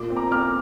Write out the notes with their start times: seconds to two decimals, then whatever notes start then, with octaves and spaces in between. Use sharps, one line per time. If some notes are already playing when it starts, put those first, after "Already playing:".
Already playing: A#2 D6
0.10 C4
0.16 A#5 D6
0.31 C4 D6 F6